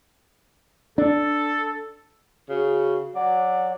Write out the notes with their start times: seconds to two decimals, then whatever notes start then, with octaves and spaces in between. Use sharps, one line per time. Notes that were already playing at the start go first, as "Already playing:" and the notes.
0.98 D4 A4
2.49 C#3 F#4
3.15 F#3 D5 F#5